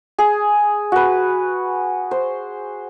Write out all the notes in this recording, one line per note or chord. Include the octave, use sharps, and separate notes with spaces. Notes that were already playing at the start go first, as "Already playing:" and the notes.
G#4
F#4 B4
C5